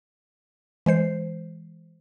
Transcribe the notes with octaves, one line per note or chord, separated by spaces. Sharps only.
E3 G#3 C5 C7